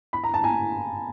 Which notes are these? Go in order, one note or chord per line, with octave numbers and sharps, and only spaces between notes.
B5
A#5
A5
G#5 A#5